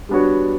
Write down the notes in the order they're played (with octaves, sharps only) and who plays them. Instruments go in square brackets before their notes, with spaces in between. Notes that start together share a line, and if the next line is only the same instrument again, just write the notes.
[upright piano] G3 B3 D4 F#4 C#5